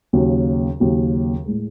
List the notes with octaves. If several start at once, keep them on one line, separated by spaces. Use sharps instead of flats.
D#2 C#3 F#3 C#4
D#2 C#3 F#3 C#4
A2 G#3